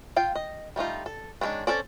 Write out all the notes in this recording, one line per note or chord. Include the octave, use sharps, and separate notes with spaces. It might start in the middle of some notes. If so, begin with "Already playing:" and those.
F4 F5 G5
D#5
G3 A3 D#4 F4
A4
D#3 G#3 A3 C#4 D4
C4 C#4 A4 D5